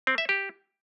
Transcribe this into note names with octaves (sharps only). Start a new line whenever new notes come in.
C4
E5
G4